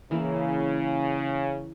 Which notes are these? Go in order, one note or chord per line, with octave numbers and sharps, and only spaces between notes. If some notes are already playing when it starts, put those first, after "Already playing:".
C#3 E3 A#3 E4